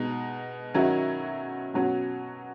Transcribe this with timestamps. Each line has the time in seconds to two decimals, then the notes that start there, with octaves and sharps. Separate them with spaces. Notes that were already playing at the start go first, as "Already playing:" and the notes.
Already playing: B2 G#3 D#4
0.74 D#3 F#3 C#4 E4
1.74 B2 F#3 C#4